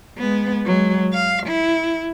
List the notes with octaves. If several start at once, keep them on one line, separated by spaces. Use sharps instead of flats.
G#3 B3
F#3 G#3
F5
E4